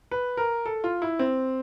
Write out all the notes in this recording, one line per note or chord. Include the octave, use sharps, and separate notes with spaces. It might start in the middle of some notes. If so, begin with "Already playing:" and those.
B4
A#4
A4
F4
E4
C4